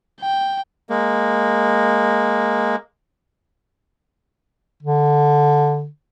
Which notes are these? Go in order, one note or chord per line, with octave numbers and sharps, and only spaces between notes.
G5
G#3 A#3
D3